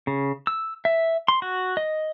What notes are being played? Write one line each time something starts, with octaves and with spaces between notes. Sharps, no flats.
C#3
E6
E5
C6
F#4
D#5